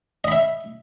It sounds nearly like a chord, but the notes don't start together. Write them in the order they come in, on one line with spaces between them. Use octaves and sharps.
D#5 B5 E5